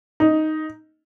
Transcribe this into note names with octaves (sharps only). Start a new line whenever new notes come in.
D#4